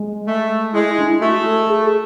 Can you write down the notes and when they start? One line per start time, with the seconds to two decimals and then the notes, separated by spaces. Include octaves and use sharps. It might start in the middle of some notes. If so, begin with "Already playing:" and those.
Already playing: G#3
0.27 A3
0.73 G#3 E4
0.90 E4
0.99 D4
1.05 E4
1.20 A3 F#4
1.45 A4
1.68 G#4
1.83 G#4